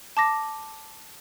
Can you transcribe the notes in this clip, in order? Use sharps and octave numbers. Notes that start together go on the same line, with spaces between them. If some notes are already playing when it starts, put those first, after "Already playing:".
A5 D6 A#6